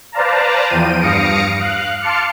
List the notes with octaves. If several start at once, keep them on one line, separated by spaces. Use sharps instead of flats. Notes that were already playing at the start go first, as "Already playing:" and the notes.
B4 C5 D5 F5 A5 A#5
E2 F3 G5 D#7
G2 F5 D#6 A#6 C#7 D7
F5 F#6
F5 A5 C6 D6 F6 C#7